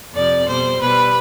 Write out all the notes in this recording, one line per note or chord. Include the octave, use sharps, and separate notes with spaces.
F2 C3 F3 D5
B2 G3 C5
B2 G3 B4